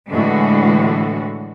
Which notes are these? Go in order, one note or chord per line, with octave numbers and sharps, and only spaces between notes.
A2 D3 E3 G#3 F#4